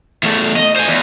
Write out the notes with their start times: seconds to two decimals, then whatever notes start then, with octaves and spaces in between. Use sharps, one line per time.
0.23 E2 A3
0.56 D#5
0.76 C5 G#5
0.88 E2